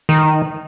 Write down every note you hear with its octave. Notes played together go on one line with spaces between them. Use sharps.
D#3